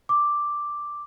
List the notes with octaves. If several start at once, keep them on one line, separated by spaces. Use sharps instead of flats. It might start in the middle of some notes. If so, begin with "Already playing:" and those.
D6